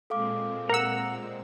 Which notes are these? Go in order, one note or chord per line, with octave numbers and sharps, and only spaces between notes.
A#2 G#3 C4 A4 F5 D6
A#4 F#5 A#5 E6